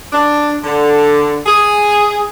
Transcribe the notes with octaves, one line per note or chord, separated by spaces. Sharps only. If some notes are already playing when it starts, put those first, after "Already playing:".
D4
D3
G#4